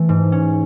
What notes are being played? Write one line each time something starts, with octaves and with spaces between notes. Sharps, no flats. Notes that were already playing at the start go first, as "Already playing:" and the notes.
Already playing: E3 A3
G#2
C#4